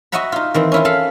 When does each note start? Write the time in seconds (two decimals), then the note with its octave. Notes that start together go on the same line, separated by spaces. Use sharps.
0.12 F#4 D#5 E5 F#5 A#5 B5
0.32 D#4 F4
0.54 D#3 E3 C4
0.72 C#4 E4 F4
0.85 A4 F5 B5